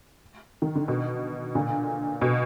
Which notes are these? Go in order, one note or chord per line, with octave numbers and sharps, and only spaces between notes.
D#3
D3
B2
A#2 D3
B2